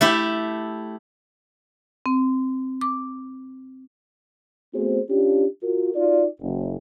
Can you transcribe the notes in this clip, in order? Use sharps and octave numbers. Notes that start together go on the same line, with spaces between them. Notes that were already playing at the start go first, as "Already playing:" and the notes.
A3 E4 G4
C4
D6
A3 B3 C4 F#4 G#4 C5
C#4 D4 F4 G4
F4 F#4 A#4
D#4 F4 F#4 D5
F#1